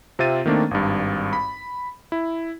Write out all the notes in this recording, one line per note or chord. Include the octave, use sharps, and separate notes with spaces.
C3 C4 F4 E5 A6 D#7
D#3 A3 A#3 C4 D4
G#1 G2
B5
E4